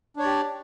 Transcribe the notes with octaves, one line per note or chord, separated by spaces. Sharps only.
D4 G4 C#5 D5